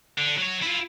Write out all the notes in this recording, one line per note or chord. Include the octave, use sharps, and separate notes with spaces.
D3
F#3 C#5
E4 F4